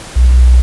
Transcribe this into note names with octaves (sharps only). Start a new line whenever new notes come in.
B1